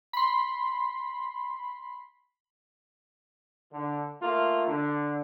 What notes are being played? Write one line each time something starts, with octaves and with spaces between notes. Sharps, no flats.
B5 C6
D3
A3 A#3 F4
D3